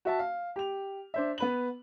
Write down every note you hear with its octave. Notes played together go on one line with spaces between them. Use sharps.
F#4 E5 A5
F5
G4 F7
D4 C5 E5
B3 B4 F#7